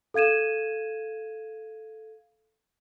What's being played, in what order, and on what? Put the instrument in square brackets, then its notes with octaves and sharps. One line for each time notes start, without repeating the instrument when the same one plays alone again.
[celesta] A4 F5 G#6 D#7 E7